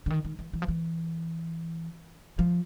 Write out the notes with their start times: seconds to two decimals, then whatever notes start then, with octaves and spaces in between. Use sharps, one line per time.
0.06 D3
0.10 D#3
0.25 D#3
0.39 E3
0.53 E3
0.62 F3
0.68 E3
2.39 F3